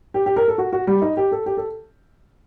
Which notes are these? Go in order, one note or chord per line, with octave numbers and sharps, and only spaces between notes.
G4
G4
A#4
A4
F#4
F#4
G3
D#4
G4
A4
G4
A4